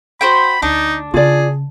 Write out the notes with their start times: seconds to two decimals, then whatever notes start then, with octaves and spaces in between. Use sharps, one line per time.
0.21 F#4 C5 G5 B5
0.62 D2 A3 D4 D#4
1.14 C#3 F4 G#4 D5